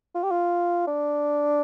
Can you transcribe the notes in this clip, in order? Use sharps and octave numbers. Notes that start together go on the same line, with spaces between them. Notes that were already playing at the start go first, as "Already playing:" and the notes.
F4
G4
F4
D4